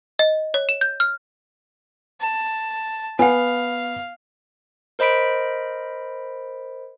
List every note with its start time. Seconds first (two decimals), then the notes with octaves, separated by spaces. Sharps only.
0.19 D#5
0.54 C#5
0.69 E7
0.81 G6
1.00 F6
2.21 A5
3.19 B3 F5 F#5 G#5
4.99 A#4 C5 D#5 B5 B6 D7